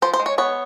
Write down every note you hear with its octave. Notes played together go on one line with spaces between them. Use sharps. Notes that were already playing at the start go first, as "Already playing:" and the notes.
F3 C5
C5
G#3
C#5
B3 C#5